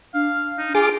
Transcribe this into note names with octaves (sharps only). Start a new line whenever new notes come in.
D4 F5
D#4
F4 G#4 D6